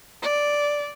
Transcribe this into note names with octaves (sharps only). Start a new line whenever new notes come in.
D5